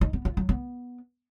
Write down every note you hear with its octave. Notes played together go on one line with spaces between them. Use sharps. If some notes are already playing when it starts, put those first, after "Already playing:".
D#4
B3
F4
F#3
B3